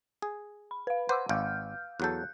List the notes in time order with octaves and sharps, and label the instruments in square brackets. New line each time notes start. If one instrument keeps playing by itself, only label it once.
[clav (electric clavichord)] G#4
[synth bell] B5
B4 F5
[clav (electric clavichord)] B4 C5 [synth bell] F#5 D6 E6
[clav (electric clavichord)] G#1 [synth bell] F5 F6 G6
[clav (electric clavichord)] E2 F#3 A4 [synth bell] F#6 G6